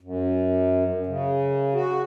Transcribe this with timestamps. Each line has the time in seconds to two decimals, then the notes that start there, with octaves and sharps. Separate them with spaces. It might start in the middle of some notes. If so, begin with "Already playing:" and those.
0.01 F#2
1.06 C#3
1.74 F#4